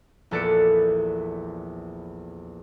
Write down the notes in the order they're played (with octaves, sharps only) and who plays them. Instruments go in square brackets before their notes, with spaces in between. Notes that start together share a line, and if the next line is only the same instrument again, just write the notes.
[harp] A#1 E2 A4 B4 D5 C#7